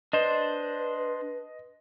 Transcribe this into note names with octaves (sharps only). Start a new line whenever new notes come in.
D4 B4 C5 D#5